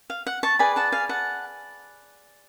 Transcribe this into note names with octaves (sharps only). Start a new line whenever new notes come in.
F5
F#5
A5 C#6
G#4 B4 D5 G#5 B5
F#5 A5
F5 G#5
F#5 A5